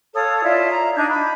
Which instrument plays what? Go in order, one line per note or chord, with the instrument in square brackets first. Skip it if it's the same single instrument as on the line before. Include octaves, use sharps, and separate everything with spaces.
[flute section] A4 C#5 F5 D#6
E4 F4 D5
A#5
D4 D#4 G6 G#6
B5